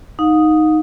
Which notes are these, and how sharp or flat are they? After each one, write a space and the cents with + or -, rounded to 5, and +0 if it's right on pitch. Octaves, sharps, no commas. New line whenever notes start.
D#4 +0 F5 +45